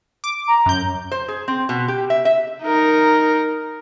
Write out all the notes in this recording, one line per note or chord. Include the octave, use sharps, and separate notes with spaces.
D6
A#5
F#2 G6
C5
G#4
C4
B2
G4
E5
E5
D#4 A#4